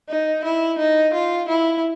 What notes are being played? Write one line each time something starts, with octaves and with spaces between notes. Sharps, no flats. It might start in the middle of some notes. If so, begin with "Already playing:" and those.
D#4
E4
D#4
F4
E4